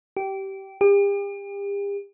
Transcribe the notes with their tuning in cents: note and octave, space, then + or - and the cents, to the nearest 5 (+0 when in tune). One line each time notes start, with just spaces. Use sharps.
G4 -20
G4 +40